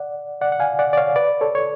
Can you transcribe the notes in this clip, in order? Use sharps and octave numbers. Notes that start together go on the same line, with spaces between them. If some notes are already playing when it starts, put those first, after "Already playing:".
Already playing: D5 F#5
D5 F#5
F#5
F5 G#5
D5 F#5
D5
C#5 F5
B4 D5
A4 C#5
C#5